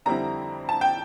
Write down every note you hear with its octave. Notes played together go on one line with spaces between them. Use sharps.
F2 D3 G3 C4 E4 A#5
A5
G5